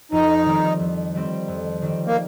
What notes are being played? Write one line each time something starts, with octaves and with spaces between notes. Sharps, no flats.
F2 D#4
D#3 G3 C4
F2
D#3 G3 C4
F2
D#3 G3 C4
A#3